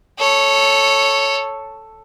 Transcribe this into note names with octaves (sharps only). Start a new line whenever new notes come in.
A4 C#5